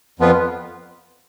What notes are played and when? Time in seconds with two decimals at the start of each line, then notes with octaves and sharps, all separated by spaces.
0.20 F2 F3 B3 F4 B4